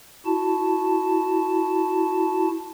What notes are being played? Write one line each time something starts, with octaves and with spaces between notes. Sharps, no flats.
E4 F#4 A5